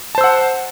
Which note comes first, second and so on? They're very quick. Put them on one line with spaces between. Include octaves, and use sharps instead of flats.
A5 C5 E6 F#5